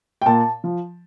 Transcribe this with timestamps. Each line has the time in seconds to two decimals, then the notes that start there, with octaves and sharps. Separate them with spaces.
0.22 G5
0.26 A#2 A5
0.64 F3